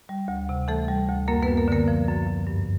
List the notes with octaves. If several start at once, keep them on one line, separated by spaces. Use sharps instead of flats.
G3
D2
C3
E3 A3 A4
G3
D2
F#2 A#3 A#4
B3 B4
F#2
A#3 A#4
D3 A#3 A#4
F3
F#2
F#2
G2